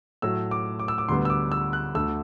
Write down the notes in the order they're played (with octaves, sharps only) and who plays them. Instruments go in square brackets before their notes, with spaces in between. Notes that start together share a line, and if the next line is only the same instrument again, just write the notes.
[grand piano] A2 F#3 A3 E6
D6
D6
E6
D6
D2 D3 G3 B3 C6
E6
D6
E6
F#6
D2 D3 A3 E6